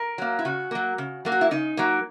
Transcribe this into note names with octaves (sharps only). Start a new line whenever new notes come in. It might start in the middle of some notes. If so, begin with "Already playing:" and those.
Already playing: A#4
F#3 A#3
E4
C#3 F#4
F#3 A#3
C#3
F#3 A#3
F#4
E4
C#3 D#4
F#3 A#3